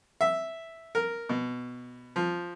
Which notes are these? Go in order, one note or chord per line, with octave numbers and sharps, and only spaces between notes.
E5
A#4
B2
F3